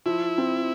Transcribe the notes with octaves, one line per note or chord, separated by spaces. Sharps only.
F3 E4
C4